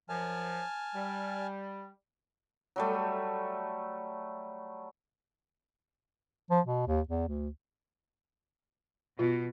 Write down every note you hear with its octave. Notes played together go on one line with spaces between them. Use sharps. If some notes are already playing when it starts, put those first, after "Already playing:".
F#2 F3 G#5 A5 F6
G3
F#3 G3 A3
F3
B2
D#2
E2
D2
B2 F4